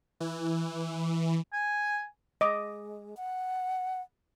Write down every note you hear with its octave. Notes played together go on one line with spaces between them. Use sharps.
E3
G#5
G#3 D#5 D6
F#5